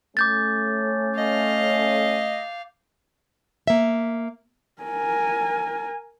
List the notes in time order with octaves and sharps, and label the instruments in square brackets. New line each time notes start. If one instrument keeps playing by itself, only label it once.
[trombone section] A3 C#4 [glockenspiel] D6 G6 A6
[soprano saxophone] D#5 [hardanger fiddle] F5
[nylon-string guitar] A#3 E5
[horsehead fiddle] A#4 G#5